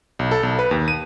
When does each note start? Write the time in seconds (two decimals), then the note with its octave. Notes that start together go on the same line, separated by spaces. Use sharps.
0.19 B1
0.31 A4
0.43 B1
0.59 B4
0.71 D#2
0.88 D#7